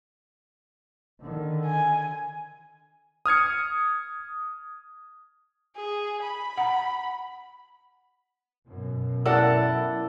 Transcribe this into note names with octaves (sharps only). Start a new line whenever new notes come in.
D3 D#3
G#5
D#6 F6 G#6 C#7
G#4
B5
F#5 A#5
F#2 B2
E4 A4 A#4 D5 F#5